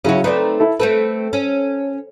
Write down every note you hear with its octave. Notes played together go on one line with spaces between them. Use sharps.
C#3 F#3 C#4 E4 F#4
A3 C4 D#4 B4 D5
E4 A4
A3 C4 A4 B4
C#4